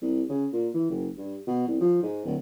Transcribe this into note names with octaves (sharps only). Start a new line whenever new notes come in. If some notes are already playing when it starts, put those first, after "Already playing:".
C2
C#3
A#2
E3
F#1
G2
B2
C2
F3
G#2
D1